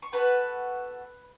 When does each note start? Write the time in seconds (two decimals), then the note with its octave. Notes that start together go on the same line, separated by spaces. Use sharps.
0.02 C#6
0.12 B3 F#4 A4 B4 B5